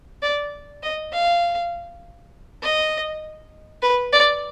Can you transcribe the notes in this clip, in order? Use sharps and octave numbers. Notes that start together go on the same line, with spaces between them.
D5
D#5
F5
D#5
B4
D5